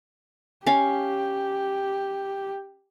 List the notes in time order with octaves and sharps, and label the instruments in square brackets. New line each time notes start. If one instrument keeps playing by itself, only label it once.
[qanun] C#4 F5 [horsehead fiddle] G4